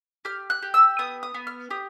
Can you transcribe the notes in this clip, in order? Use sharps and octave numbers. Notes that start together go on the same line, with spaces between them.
G4 F6
F#6
G4
E6
B3 D#6
D#6
B3
F6
G4 D#6